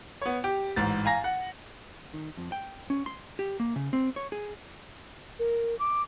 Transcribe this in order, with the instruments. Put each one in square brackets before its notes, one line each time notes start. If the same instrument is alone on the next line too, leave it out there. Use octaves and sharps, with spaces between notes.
[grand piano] B3 C#5
G4
A1 G#2 A6
F5 G#5 A#5 A#6
F#5
[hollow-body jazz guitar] D#3
F2
G5
C#4
C6
G4
A#3
C#3
C4
C#5
G#4
[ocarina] A#4
D6